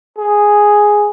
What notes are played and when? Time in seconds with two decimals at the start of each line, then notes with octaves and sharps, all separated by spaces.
0.18 G#4